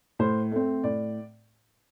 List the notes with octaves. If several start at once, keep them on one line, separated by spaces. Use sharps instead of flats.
A2 C5
A3 C4
A2 D5